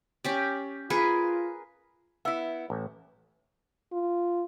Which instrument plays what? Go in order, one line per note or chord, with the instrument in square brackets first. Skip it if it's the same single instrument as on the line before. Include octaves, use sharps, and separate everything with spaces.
[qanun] C#4 G4 D5
[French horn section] F4 [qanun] G#4 A#4 B4
[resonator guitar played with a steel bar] B3 E4 [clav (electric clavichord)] E5
[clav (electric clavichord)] A1
[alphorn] F4